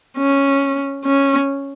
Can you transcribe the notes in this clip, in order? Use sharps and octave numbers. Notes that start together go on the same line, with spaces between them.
C#4
C#4